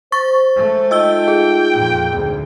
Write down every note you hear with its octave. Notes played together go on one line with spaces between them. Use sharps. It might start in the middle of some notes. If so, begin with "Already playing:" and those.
C5 C#6 A6
G#3 A3
D#4 F4 D#5 G5 E6 G7
G#4
F2 A#2
G#1 D2